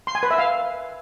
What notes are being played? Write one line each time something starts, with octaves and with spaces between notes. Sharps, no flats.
C6
G#5
B4
E5
F5